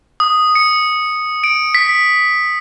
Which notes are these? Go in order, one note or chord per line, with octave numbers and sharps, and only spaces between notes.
D#6
C#7
D7
B6